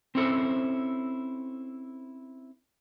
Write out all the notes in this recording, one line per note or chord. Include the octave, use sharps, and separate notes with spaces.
C4 C#4 E4 A4 C5